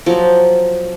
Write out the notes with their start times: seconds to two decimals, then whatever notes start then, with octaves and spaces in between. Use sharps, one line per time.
0.06 F3 F#3